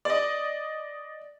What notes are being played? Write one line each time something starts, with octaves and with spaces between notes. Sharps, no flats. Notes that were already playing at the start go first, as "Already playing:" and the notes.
D5 D#5